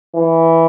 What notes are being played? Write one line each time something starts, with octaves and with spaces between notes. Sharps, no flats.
E3